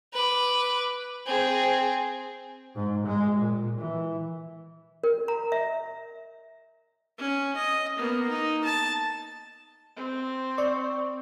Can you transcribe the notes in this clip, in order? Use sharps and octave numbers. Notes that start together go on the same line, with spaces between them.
B4 D6
C4 G#4
G#2
G#3
A#2
E3
A#4
A#5
E5
C#4
D#5
A#3 B3
D#4
A5
C4
D5 C#6